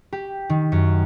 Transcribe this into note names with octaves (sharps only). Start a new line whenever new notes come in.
G4
D#3
F#2